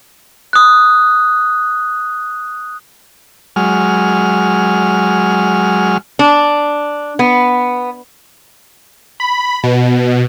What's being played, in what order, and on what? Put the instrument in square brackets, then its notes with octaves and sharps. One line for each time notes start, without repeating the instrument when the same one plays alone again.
[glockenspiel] D#6 F#6
[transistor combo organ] F#3 G#3 F6
[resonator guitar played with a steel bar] D4
B3
[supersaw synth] B5
B2